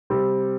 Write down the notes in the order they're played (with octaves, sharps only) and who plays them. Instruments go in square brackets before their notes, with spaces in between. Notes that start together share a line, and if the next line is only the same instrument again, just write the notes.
[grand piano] C3 G3 C4